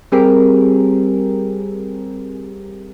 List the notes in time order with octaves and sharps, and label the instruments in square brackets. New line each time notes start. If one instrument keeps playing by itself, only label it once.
[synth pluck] G3 C4 G4 G#4 A#4